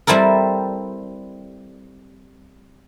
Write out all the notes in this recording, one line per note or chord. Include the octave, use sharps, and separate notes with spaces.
G3 C4 E4 A4 A#4